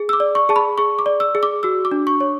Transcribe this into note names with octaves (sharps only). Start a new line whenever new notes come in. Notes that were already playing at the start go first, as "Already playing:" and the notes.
Already playing: G#4
E6
D6
D5
C#6
G#4 A5
B5
G#4 C#6
D6
D5
E6
G#4
D6
F#4 E6
D6
D4
C#6
C#5